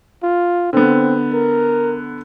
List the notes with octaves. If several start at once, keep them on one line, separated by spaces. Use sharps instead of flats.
F4
D3 B3 C4
A#4